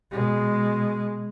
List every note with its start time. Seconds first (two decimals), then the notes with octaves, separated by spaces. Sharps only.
0.12 B2 G#3